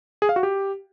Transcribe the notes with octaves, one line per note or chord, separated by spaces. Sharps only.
G#4
F5
F#4
G4